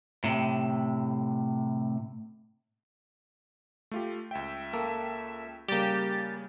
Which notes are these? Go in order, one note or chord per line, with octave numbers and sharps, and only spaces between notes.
A2 C3
A3 F4 G4
C#2 E5 G5
A#3 A4
C#3 G3 A#3 G4 D5 A6